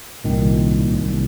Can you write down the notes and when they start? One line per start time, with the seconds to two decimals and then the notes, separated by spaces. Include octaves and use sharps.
0.24 C2 A#2 D#3
0.95 C2 A#2